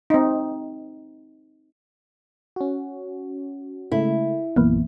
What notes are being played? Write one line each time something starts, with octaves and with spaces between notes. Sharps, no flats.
C4 D#4
C#4 F#4
C#3 G#3 A3 E4
A#1 F#2 E3 A#3 B3